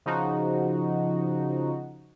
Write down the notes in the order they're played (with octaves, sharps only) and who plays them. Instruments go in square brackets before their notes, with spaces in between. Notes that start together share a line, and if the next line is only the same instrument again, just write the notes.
[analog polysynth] C#3 F3 D#4 F#4